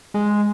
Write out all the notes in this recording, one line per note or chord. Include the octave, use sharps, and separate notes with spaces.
G#3